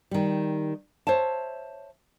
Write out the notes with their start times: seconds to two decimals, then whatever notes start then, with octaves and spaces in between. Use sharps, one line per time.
0.11 D#3 G3
1.07 C5 C#5 E5 A5